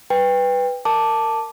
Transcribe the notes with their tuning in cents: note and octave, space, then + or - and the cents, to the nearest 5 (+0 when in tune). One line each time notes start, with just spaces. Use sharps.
B4 +5 G5 +25
A#4 -15 A5 +0 D6 +0